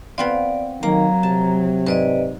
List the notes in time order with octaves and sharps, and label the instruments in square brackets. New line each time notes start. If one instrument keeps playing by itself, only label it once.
[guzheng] B3 C4 F4 [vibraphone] D5
[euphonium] D#3 [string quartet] F#3 [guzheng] A#3 [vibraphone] A#5
[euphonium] C3 [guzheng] A5
[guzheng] G#2 [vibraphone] B4 D5 D#5